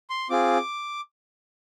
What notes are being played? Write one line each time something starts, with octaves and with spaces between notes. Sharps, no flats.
C6
C4 F4 G#4 D6